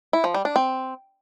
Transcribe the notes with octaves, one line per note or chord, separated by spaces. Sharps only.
E4
F3
G3
D4
C4